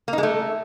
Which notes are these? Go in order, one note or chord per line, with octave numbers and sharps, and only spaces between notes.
A#3
D#4
G#3
A3